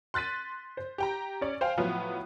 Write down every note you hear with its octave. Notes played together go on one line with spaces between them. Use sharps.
C6 F#6 A6 B6 D#7
C5
G4 G5 A#5
C#4 C#5 D5
C5 F5 G5 G#5
A2 F3 F#3 B3 F4